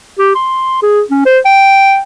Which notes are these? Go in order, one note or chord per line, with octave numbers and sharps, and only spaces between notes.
G4
C6
G#4
C#4
C5
G5